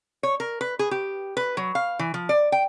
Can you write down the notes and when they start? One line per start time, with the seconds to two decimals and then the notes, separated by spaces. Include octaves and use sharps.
0.23 C#5
0.40 A#4
0.61 B4
0.79 G#4
0.91 G4
1.37 B4
1.57 F#3
1.75 F5
1.99 E3
2.14 F3
2.29 D5
2.52 G5